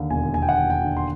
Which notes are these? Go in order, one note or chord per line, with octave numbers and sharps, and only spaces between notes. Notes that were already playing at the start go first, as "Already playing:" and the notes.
Already playing: D#2 D3
E1 G#5
E1 G#5
G5
F#5
D#2 G5
G5
D3
C6